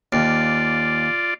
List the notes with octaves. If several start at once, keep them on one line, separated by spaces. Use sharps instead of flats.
D#2 F4 D5